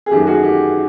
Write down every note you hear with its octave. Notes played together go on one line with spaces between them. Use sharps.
G#4
F#2 D#3 F#3 A3 G4
F#4 G#4
G4